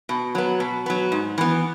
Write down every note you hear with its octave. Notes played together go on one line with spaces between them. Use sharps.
B2
F#3 B3
B2
F#3 B3
G#2
E3 B3